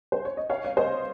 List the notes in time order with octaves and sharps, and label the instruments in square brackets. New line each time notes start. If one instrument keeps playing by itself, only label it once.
[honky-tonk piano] C5
C#5
D#5
C#5 F5
C#5
C5 D#5